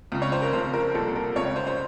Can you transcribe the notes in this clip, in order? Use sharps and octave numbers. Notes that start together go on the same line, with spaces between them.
C#2 C#3
C#5
C5
A#4
F1 F2 C#3 C5
A#4
C2 A#2 A4
A#4
C#2 C#3 C#5
C#5
C5
C5